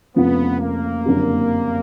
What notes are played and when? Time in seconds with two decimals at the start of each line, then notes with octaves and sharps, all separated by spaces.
0.16 F1 F2 C#3 F3 B3
0.61 A#3
1.05 F#1 F2 D3 G3